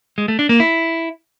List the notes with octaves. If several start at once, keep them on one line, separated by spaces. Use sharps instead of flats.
G#3
A3
D4
A#3
E4